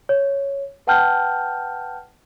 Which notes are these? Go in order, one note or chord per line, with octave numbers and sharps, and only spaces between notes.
C#5
B4 F#5 G5 A5 F6 G6